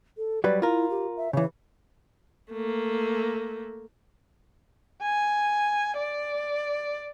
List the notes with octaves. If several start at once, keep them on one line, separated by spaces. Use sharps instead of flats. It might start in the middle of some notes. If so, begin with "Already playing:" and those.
A4
F#3 G3 B4 D5
E4 F4 A#4
G4
E5
C#3 E3 C#5
A3 A#3
G#5
D5